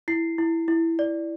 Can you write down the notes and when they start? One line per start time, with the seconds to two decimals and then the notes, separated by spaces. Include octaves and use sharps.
0.08 E4 C7
0.38 E4
0.68 E4
0.99 D5